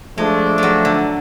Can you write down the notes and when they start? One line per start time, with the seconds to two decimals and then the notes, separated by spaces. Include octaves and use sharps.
0.17 F3 G#3 A3 D4
0.58 F#3 G#3
0.85 D3